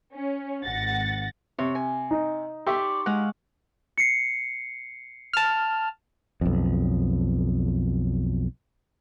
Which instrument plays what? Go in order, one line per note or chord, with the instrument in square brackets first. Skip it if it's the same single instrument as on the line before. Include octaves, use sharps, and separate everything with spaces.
[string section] C#4
G#1 F#5 A6 A#6
[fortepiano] C3 [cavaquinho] C#5
[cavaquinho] G#5
[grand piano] D#4
[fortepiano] G4 E5 [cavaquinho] D5 [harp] C6 C#6
[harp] G#3 [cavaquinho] F5 F#5
[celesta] C7 C#7
[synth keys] A5 F6
[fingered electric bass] B1 F2